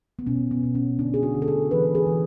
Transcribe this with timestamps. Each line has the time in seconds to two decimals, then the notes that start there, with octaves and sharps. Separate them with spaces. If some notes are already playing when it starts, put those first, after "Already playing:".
0.19 B3
0.27 B2 C#4
0.51 B3
0.64 B2
0.75 C#4
0.99 D3 D4
1.14 G#4
1.23 F#4
1.35 D3
1.42 A4
1.48 G#4
1.71 E3 B4
1.95 G#4
2.07 E3